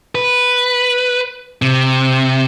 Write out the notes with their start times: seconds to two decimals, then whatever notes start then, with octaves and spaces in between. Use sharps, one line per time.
0.15 B4
1.62 C3